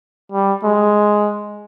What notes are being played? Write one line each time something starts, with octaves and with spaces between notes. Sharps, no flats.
G3
G#3